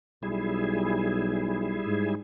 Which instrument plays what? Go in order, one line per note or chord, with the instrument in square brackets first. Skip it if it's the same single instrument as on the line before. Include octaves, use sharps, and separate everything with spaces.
[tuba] B1 [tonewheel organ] G3 E4 G#4
[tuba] G#2